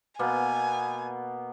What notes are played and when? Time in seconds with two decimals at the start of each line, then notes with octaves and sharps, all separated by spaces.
0.19 B2 A#3 B3 G#5